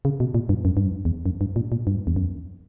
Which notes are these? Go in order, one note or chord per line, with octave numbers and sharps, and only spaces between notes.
C#3
B2
A#2
G2
F#2
G2
F#2
E2
F#2
G2
A#2
A#2
G2
E2
F#2